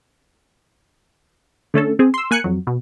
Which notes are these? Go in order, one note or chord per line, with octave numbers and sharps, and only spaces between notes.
D3 A3 C#4 A4
C4 G#4
C6 E6
A#3 G#5 F#6 C#7
F2 F#3
B2